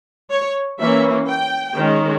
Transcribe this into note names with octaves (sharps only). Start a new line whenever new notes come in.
C#5
E3 A#3 C#4 E5
G5
D#3 G#3 C#4